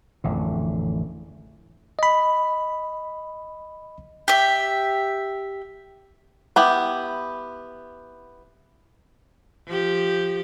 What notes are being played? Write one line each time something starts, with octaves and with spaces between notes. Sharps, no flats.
A1 F2 D3
D#5 B5
G4 E5
B3 E4 G4
F3 G4